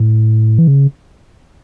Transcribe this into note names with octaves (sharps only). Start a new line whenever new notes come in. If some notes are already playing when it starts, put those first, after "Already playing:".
Already playing: A2
E3
C#3